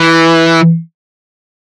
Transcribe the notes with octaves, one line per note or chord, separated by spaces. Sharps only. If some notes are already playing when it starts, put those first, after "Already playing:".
Already playing: E3